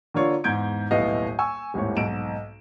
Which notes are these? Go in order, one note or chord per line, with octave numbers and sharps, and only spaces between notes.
D3 A#3 D4 F4 C#5 D5
E2 G#2 G6 G#6 D7
D#1 B1 A2 B3 D#5 F5
G#5 C#6 E6
D#1 G#1 A2 C#5
B1 G#2 D7 E7